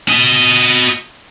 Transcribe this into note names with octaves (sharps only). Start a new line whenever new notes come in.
F#4 D#5